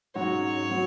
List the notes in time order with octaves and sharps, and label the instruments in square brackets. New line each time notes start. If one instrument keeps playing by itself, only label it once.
[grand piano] G#2 F#3 C#4 F#4 [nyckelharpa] C#5
[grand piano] F#3